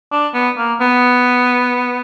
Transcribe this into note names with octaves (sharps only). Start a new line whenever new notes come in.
D4
B3
A#3
B3